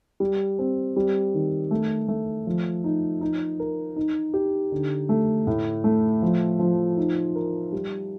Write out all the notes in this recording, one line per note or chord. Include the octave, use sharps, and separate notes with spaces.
G3
C4
G3
D#3
A3
A3
F3
D#4
D#4
A#4
D#4
G4
D3
A3
A2
A3
F3
F3
D#4
A#4
G3